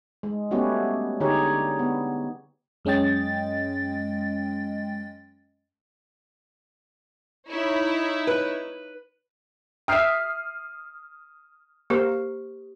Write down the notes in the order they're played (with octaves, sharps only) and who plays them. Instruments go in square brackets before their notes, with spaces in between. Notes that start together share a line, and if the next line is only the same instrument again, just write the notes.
[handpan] G#3
G3 A3 B3 C#4 F#4 G4
D3 D#4 G4 G#4 C#5
B3
[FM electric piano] F#2 G#3 C#4 D#5 G5 A6
[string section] D#4 E4 C#5
[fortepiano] B4
[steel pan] E5 G5 [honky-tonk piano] D#6 F6 C7
[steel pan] A#3 A#4 C5 [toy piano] G4